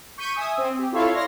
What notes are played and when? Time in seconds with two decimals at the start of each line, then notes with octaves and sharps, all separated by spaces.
0.18 C#6 G6 B6 C#7 D#7
0.34 E5 G#5 D#6 E6
0.57 C4
0.78 G4
0.92 E4 F4 A4 C#5 E5 F5
1.13 D5 C6 F6 A#6